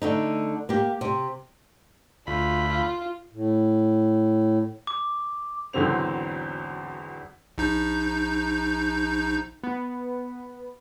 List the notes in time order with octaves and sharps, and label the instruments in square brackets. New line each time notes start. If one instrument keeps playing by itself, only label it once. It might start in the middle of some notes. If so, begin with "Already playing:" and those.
[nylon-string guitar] D3 A3 D#4
A#3 G4
C3
[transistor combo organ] D2 B5 [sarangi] F4
[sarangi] F4
[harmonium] A2
[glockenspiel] D6
[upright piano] G#1 E2 D3 F#3 C4 F7
[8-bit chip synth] A#1 D#4 G6
[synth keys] B3